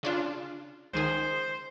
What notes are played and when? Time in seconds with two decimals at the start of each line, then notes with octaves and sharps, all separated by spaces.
0.03 C#3 D4 F4
0.93 C#2 D#3 G#4 C5